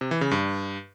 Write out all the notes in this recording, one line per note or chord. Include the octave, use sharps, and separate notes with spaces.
C3
E3
C#3
G2